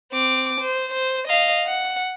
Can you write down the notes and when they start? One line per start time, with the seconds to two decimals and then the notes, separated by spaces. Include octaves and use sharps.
0.12 C4 D6
0.61 C5
0.93 C5
1.27 D#5 F5
1.66 F#5